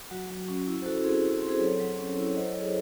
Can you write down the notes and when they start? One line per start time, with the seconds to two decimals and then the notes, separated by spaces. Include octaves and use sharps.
0.11 F#3 F#4
0.31 F#3
0.48 C#4
0.67 E4
0.82 C5
0.86 E4 F#4 A4
1.04 C4 G#4
1.24 E4
1.36 F#4 A4
1.42 C4
1.49 G#4 C5
1.60 F#3 A4 C#5
1.80 F#3
1.99 C#4
2.17 E4
2.27 C#5
2.36 F#3 C5 D#5
2.48 A4 C#5
2.54 F#3
2.60 G#4 C5